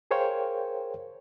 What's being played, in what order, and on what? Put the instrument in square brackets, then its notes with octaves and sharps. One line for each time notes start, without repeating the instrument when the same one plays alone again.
[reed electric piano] G#4 A#4 C5 C#5 F5 G5